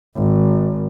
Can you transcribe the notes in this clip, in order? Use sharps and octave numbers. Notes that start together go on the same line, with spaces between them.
G#1